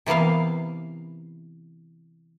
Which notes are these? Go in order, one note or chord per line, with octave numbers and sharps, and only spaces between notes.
C3 E3 A#3 B3 F5